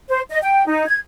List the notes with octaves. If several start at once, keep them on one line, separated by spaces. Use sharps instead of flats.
C5
D#5
G5
D#4
G#6